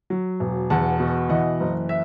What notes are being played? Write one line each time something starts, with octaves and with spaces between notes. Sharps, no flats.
F#3
E1
E2 F#5 A5
B2
E3 D#5 F#5
F#1
E5